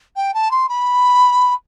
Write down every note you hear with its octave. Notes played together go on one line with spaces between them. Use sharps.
G5
A5
C6
B5